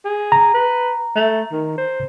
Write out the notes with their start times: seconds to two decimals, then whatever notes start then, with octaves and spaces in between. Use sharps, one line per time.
0.05 G#4
0.32 A#5
0.54 B4
1.16 A3
1.52 D#3
1.78 C5